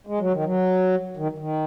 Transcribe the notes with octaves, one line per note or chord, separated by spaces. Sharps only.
G#3
F#3
D#3
F#3
D#3
D#3